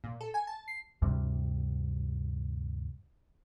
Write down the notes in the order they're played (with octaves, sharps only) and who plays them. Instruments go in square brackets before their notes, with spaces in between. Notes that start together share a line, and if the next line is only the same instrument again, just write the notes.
[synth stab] A#2
A4
G#5
A5
C7
[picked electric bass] D2 G2 C3 G3